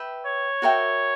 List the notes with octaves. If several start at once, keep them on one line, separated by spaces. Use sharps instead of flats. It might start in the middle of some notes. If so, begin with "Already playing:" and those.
Already playing: B4 E5 G5
C#5
F#4 A#4 E5 G5